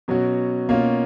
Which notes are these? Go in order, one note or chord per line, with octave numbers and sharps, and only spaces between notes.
B2 F#3 C#4 F#4
B2 A#3 C#4 F4